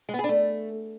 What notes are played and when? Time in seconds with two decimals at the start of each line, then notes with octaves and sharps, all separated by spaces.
0.09 G#3
0.14 B3
0.19 G#4
0.24 D4
0.29 A3